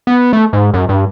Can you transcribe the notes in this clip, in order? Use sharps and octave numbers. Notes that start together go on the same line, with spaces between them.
B3
A3
G#2
F#2
G2